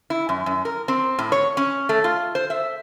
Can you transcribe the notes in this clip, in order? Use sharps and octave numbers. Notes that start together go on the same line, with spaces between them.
E4
F#2
F#2
A#4
C4
A2
C#5
C#4
A3
F4
C5
E5